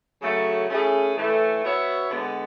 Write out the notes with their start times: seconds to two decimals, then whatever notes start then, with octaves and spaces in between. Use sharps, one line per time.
0.22 C#3 F#3 A3
0.69 A3 C#4 E4 G#4
1.16 A2 E3 A3
1.64 B3 F#4 C#5 E5
2.10 D3 G#3 B3